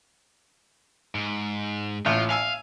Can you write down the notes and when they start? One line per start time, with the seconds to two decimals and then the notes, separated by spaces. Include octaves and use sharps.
1.15 G#2
2.06 A1 A2 F4
2.30 F5 G#5 E6